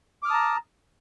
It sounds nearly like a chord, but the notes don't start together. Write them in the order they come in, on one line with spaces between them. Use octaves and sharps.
D6 F6 D#6 A5 A#5